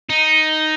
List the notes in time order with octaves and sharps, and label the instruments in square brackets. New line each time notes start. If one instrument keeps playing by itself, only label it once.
[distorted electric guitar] D#4